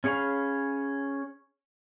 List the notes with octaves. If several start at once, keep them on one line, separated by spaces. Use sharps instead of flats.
C#4 G#4 C#5 F5 B5